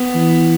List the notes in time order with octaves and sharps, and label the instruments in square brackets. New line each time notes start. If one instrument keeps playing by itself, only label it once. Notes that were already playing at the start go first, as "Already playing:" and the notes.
Already playing: [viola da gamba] B3
[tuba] E3